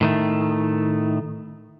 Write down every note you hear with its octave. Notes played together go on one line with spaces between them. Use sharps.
A2 D#3 A3